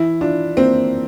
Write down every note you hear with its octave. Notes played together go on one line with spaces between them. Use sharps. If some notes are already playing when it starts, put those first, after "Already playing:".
Already playing: E3 E4
D4 F4
A#3 C4